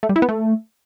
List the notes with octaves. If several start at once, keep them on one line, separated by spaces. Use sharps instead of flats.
A3
G3
E4
B3
A3